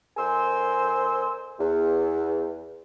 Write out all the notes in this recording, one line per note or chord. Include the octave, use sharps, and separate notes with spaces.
F2 A#4 C5 G#5 C6 E6
E2